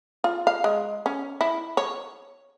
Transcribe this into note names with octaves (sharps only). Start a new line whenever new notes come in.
F4
F5
G#3
C#4
E4
C#5